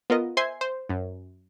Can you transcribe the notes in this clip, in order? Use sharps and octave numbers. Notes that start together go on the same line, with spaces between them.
B3 F4 A#4 D#5
C5 E5 G#5 C6 G#6 C7
C5
F#2